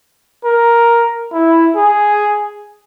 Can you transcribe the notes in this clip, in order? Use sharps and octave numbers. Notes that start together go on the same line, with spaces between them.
A#4
E4
G#4